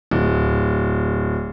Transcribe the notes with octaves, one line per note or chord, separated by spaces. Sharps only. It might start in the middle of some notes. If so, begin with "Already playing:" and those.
D1